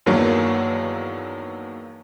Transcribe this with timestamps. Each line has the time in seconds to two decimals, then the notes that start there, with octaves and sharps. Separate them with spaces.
0.06 E2 G2 D#3 F#3 A#3